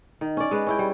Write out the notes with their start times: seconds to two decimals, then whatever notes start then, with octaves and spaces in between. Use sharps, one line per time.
0.21 D#3
0.37 C#4 D5
0.51 G#3 B4
0.67 C#4 E4 G5
0.79 G3